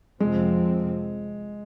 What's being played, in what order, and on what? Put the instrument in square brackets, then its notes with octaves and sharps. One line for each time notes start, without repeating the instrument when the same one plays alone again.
[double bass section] F2 C3 F3 C4 [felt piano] G#3